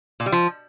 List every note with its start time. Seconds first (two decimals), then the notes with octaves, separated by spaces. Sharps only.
0.20 A#2
0.26 G3
0.32 F3